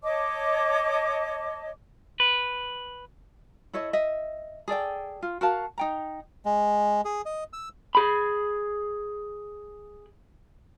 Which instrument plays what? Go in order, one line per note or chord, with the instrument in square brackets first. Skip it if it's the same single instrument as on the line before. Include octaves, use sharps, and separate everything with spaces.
[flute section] C#5 D#5 A5 D6
[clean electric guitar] B4
[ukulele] E4 A4 C#5 D#5
D#5 E5
G#4 A4 D5 G5
F4
F#4 A#4 F5 A5
D#4 G5 A#5
[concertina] G#3
G#4
D#5
E6
[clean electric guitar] G#4 B5